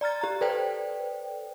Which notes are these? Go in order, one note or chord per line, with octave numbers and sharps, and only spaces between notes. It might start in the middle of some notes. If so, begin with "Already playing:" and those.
D5 A#5 F6 A6
G4 A#5
A4 B4 C5 D5 G5